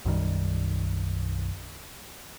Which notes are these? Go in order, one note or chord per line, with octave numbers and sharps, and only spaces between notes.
B1 F#2 D#3 G3